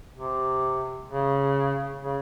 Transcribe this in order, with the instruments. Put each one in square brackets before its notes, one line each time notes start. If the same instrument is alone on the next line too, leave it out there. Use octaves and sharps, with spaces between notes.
[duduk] C3
C#3
C#3